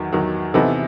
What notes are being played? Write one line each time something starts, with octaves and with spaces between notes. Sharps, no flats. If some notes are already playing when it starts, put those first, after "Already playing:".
Already playing: E2 D#3 F#3
E2 D#3 F#3
C3 E3 B3 D#4 A4